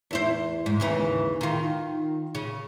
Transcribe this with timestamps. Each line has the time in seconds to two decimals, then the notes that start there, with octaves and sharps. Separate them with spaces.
0.11 E2 E4 C5
0.66 G#2
0.80 D#2 C#3 E3
1.41 D#3 F4
2.35 C#3